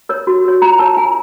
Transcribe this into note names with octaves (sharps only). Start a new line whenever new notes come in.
A#4 C#5
F#4
A#4 C#5
F4 A#5
A#4 C#5 A5
F4 G#5